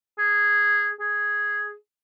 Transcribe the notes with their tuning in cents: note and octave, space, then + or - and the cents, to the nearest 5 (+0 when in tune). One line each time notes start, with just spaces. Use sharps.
G#4 -5
G#4 +0